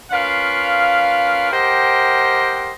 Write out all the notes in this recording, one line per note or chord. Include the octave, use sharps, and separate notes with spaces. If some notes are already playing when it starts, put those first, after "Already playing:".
C#4 F4 A#4 B4 F5
G4 A#4 C5 D#5 F#5 G5